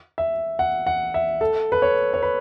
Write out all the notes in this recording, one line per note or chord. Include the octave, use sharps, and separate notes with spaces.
E5
F#5
F#5
E5
A4
B4
C#5
C#5
B4